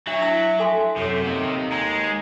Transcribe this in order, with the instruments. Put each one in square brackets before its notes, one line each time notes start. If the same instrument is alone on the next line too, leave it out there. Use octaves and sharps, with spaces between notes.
[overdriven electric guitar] F#3 [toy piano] D4 [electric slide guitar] E5
[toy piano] E4 E6
A4 G#5 C6
[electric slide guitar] F#2 [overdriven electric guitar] C3 [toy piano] A4 C#5
[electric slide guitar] A#3 D#4
[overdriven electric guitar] G#3 [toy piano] A#5